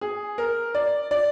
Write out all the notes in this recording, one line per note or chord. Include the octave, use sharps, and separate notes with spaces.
G#4
A#4
D5
D5